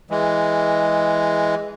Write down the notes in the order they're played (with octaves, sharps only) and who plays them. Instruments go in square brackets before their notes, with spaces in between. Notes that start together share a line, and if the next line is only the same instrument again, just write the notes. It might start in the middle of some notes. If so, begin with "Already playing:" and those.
[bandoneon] E3 G#3